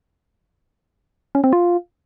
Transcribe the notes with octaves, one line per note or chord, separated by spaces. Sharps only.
C#4
C4
F4